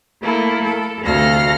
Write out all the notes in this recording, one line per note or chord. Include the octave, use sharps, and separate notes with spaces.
A3 A#3 E4 A4
A4
D2 C3 A4 F5 F6 A#6